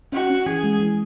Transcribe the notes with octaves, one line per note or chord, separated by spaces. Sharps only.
C#4 F#4
C#4
E3 G#4
G#3
E3